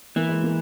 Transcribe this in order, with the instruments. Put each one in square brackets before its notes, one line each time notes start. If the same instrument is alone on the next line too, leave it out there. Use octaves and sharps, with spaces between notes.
[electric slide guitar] E3 [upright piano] A#3
[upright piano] G#3
A#3